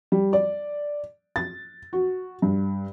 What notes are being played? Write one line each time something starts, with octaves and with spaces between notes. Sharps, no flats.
G3
D5
A6
F#4
G2